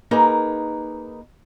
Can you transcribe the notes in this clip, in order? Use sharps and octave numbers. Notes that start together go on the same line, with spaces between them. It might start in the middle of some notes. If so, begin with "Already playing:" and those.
A#3 D#4 G#4 A#4 B4